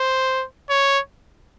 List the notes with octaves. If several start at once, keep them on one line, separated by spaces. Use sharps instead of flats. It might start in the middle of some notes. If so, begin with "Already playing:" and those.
Already playing: C5
C#5